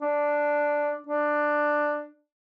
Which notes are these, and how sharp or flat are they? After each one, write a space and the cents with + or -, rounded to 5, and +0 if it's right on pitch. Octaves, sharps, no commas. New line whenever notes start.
D4 +0
D4 +10